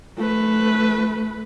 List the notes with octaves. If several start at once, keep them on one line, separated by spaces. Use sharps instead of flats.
A3 B4